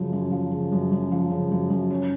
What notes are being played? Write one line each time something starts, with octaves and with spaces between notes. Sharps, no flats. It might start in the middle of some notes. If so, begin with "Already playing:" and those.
Already playing: F#2 C#3 F3
F#2
F3
C#3
F#2
F#2
F3
C#3
F#2
F#2
C#4